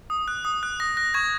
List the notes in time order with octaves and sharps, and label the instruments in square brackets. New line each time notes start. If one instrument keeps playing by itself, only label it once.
[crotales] D#6
F#6
D#6
F#6
D#6 A#6
F#6 A#6
C#6 G#6